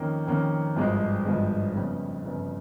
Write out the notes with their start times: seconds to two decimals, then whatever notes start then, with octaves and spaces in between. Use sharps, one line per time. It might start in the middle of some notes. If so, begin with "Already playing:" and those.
Already playing: F2 D#3 A#3 C#4
0.27 F2 D#3 A#3 C#4
0.76 G#1 G2 F3 G#3
1.25 G#1 G2 F3 G#3
1.75 G1 F2 C#3
2.24 G1 F2 C#3